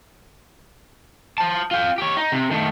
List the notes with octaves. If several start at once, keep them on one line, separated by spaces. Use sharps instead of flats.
C5 A5
F4 G5
G4 C#5
D#4
C3
D#3 A3